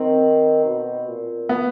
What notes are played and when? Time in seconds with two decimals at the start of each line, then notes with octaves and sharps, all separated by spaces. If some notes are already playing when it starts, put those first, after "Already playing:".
Already playing: D#3 C4
0.65 B2
1.08 A#2
1.49 B3